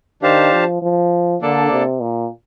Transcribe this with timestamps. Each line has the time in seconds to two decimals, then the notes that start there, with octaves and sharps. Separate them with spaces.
0.22 D#3 D4 G4 C5 F5 A5
0.53 F3
0.82 F3
1.42 D3 A#3 D4 A4 D5 A5
1.71 C3
2.01 A#2